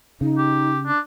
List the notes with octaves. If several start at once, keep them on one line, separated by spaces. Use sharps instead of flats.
C#3 D#4
G4
D4